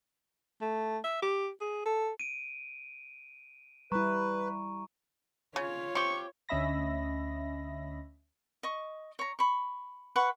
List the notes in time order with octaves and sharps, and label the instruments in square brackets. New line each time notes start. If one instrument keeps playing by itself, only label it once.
[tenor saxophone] A3
E5
G4
G#4
A4
[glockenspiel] D7 D#7
[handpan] G3 E4 [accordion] B4 [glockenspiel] A#5 C#6
[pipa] C#3 [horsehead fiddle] F4 C#5
[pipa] C4 G4 [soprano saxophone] C#6
[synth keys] D2 C#4 D#5 E5 B5 A#6
[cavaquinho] D#5 C#6
C#5 A#5
B5 C#6
B4 F#5 C#6